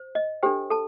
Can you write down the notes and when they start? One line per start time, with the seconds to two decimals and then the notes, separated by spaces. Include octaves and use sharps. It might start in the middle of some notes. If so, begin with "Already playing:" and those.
Already playing: C5
0.15 D#5
0.43 D4 G4 A4 C5 G5
0.70 A4 A5